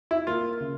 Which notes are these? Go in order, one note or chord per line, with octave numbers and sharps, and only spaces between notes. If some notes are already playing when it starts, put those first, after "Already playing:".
E4
A#3 F4
C#3